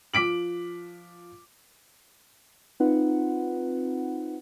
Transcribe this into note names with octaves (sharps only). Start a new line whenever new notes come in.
F3 D6 B6 D7 F#7
C4 D#4 F4 B4 F#5